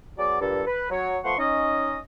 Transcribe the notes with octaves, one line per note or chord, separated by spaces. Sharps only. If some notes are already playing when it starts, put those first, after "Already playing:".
F#3 B3 G#4 D5
G2 A#2 A4
B4
F#3 C#5
F3 A3 B3 F#5 C6 C#6
C#4 D#4 D#5